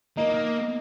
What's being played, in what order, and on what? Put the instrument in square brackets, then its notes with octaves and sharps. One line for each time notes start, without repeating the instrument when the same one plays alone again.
[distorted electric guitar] A#3 [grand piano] D#4